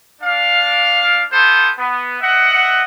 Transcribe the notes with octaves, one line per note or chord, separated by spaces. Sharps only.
D4 F5
B3 F4 A4 C5
B3
D#5 E5 F#5